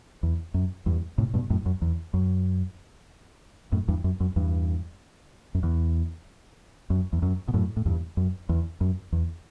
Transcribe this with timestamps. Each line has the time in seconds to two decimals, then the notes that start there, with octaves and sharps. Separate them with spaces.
0.23 E2
0.54 F#2
0.86 E2 G2
1.18 A2 C3
1.34 G2 B2
1.50 F#2 A2
1.66 F#2
1.82 E2
2.14 F#2
3.72 F#2 A2
3.88 E2 G2
4.04 F#2
4.20 F#2
4.36 E2 G2
5.55 F#2
5.63 E2
6.90 F#2
7.13 E2
7.22 F#2
7.48 B2
7.53 F#2 A2
7.77 A2
7.86 E2 G2
8.17 F#2
8.49 E2
8.81 F#2
9.12 E2